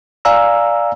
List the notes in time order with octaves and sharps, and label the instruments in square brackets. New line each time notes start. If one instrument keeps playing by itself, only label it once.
[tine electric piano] D5 F5 G#5 A#5 E6